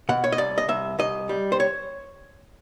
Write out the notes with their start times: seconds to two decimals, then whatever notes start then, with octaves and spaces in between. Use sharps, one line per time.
0.09 B2 F#5
0.24 C#5
0.32 D#5
0.38 C2 D5
0.58 D#5
0.68 C2 E5
0.98 C2 D#5
1.29 G3
1.52 C5
1.60 C#5